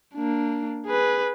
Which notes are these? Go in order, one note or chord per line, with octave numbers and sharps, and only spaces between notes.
A#3 D4
G#4 B4